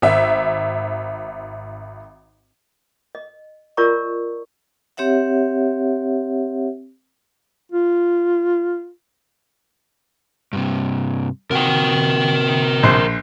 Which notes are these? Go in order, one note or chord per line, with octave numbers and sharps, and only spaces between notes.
G#1 E5
D#5
F4 A#4 D5 D#5 A#5 C#6
C4 G4 C#5 E5 F#5
F4
G2 C3
C3 F#4 A#4 G5
A#1 C5